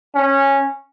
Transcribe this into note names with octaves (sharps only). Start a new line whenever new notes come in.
C#4